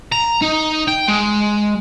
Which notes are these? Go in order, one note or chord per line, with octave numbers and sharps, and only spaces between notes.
A#5
D#4
G5
G#3